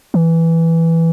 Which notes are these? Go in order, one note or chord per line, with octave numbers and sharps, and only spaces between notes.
E3